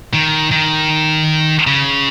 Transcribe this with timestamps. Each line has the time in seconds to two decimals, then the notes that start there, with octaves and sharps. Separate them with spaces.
0.13 D#3
0.52 D#3
1.67 C#3